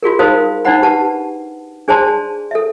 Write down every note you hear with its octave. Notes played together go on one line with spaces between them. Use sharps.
F4 F#4 G#4 A#4
D#4 F#4 A#4 C5 F5 D#6
D4 D#4 C5 F#5 B5
G4 B4 F#5 A5
D4 G#4 C5 D5 A5 C6
A4 E5